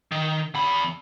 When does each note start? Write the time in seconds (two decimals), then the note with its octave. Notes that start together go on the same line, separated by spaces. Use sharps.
0.12 D#3
0.54 E2 B5